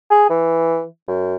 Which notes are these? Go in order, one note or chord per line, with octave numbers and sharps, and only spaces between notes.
G#4
E3
F#2